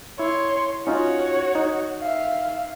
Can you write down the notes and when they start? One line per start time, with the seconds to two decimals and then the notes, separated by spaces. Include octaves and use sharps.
0.19 E4 C#5 C6
0.87 C#4 D#4 F4 F#4 C#5
1.55 D#4
2.01 E5 F5